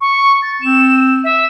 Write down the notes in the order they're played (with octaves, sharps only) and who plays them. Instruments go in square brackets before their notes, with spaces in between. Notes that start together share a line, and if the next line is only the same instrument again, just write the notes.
[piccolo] C#6
A6
[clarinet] C4 [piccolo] E7
[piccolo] E5